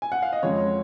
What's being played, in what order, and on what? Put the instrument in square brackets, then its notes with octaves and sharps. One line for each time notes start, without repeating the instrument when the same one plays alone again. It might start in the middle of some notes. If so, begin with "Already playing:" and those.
[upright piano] G#5
F#5
F5
D#5
F2 C#3 F3 G#3 C#5